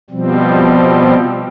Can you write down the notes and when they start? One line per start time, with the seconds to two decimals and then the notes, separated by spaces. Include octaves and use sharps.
0.10 B2 F3 G3 C4